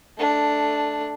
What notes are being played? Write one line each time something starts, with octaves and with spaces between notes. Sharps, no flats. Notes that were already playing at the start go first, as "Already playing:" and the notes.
A3 D4